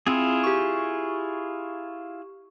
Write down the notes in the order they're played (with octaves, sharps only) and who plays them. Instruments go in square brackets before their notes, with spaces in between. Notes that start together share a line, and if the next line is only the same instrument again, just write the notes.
[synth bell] C4 [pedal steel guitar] E4 F4 G#4
[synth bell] G4 C#6